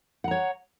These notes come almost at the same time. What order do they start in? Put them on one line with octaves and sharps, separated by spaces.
F#5 A#5 C#5